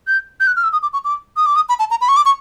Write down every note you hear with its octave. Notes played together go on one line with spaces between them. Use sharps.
G6
G6
F#6
F6
E6
D#6
D6
C#6
D6
D#6
D6
D#6
B5
A5
A#5
B5
C#6
D6
C#6